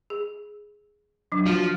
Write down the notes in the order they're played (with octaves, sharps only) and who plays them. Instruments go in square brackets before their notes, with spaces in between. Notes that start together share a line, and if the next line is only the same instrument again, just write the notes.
[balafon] G#4
F#3 D4
[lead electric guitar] F3 [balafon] F#4